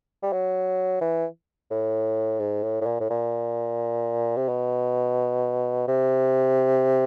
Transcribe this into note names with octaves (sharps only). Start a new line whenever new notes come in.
G3
F#3
E3
A2
G#2
A2
A2
A#2
A2
A#2
C3
B2
C3